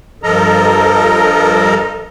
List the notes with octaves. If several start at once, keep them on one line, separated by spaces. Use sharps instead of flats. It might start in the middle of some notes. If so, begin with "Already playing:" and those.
G2 F3 A4 A#4 D#5 A#5